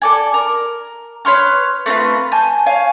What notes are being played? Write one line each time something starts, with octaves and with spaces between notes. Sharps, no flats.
A4 D5 G#5
A#4
B4 C#5 C6 F6
A3 C4 F4 B4
G#5 A5 G6
C#5 F5 G#5